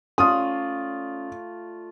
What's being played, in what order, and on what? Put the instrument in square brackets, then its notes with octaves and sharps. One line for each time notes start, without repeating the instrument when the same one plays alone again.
[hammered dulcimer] A3 F4 D5 [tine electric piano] C#4 [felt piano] D#6